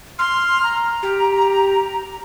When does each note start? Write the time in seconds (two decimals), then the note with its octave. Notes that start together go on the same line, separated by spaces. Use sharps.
0.19 C6 F6
0.63 A#5
1.03 G4